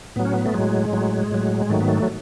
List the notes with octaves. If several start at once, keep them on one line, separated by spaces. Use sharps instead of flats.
A2 F#3 B3
C#4
B3
A3
A2 F#3 G#3
A2 F#3
A2 F#3
G#2 D#3 F#3 A3
B3
A3
F#3